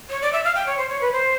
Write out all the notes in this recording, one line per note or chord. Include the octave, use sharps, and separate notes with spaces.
C#5
D5
E5
F5
G5
C#5
C5
C#5
B4
C5